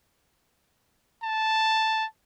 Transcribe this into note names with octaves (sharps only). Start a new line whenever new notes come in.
A5